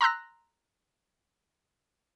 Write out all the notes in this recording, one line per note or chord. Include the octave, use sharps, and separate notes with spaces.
A#5 C6 E6 F#6 A#6